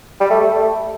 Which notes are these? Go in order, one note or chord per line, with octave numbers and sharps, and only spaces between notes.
G3
A3
A3
A3